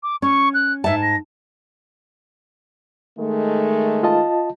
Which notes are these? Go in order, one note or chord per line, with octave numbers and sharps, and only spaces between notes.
D6
C#4 C#6
F#6
G#2 E5 A5
A#6
D#3 G#3 A3
F4 D#5 A5